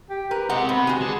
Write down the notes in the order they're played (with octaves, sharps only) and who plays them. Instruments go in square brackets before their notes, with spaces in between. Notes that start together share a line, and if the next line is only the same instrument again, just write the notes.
[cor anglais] G4
[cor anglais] A#4 [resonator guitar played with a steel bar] B4
[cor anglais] G#3 [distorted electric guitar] C4 G4 [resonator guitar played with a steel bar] F#5
[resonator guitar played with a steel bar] G#2 [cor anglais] B3
[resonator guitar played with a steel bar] G#3 F#4
[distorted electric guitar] D3 A5 [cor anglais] G#4